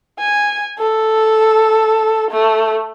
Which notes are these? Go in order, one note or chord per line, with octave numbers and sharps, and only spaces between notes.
G#5
A4
A3